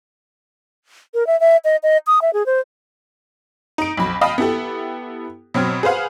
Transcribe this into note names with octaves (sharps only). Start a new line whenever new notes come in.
A#4
E5
E5
D#5
D#5
D#6
E5
G#4
C5
D#4 D7
B1 F2 B5
D#5 F5 G5 A5 B5 D#6
B3 E4 G4 A4
B2 F#3 C4 F6 G#6
G#4 B4 C5 F5 F#5